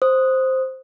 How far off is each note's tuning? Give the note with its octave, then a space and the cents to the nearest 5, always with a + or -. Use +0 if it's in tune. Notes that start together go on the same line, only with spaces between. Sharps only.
C5 +0 D#6 +0